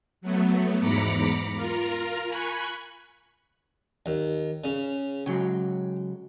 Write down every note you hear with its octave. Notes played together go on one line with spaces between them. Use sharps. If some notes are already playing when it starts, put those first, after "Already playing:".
F#3 A3 B3
E2 G#2 A#5 B5 D6 C#7
F4 A#4 A#5
G#5 B5 C#6 F#6
D#2
C#3
C#3 F#3 G#3 G5